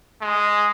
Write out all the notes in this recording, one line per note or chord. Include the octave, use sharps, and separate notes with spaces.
G#3